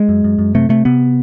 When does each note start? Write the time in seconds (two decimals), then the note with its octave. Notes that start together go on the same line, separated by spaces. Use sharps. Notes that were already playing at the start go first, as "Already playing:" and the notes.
Already playing: G#3
0.09 F#2
0.24 F#2
0.38 F#2
0.55 C3 A3
0.69 C3 A3
0.85 C3 B3